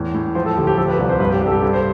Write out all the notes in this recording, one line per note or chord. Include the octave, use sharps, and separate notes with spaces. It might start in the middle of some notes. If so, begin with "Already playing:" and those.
Already playing: E2 A2
A2
F3 C5
A4
D2 G4
G4
F3 A4
B4
C2
C5
G2 B4
G4
G2 G4
A4
G4
G2 A4
C5